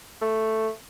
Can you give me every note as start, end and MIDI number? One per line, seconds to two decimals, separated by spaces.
0.22 0.70 57